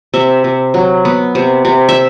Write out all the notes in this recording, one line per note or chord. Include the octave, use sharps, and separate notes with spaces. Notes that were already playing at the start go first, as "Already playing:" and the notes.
C3 E5
C3
F#3
B3
C3
C3
E5